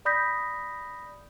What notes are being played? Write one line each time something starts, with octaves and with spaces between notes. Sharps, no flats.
D5 B5 D#6 G6 A#6 B6